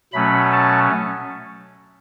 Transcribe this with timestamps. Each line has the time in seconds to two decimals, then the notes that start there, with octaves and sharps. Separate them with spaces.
0.13 B2 F#3 A3 C#4 B5
0.52 A5